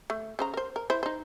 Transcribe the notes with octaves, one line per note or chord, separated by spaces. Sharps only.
A3
C#3 C5 A#5
A#4 C5
A#4
E4 C5
D#4 C5